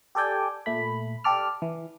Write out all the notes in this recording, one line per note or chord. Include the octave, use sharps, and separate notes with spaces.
G4 A4 D5 G5 G#5
A#2 A3 B5
G4 A4 D5 F6
E3